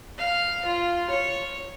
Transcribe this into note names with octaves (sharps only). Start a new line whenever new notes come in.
F5
F4
C#5